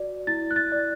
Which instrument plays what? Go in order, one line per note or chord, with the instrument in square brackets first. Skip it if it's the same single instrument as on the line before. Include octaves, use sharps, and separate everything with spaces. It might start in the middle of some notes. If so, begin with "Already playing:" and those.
Already playing: [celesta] F#4 D5
E4 A6
F#6
A6
D5